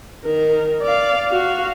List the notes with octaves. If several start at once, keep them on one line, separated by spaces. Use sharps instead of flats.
D#3 A#4
D5 F5
F#4 F5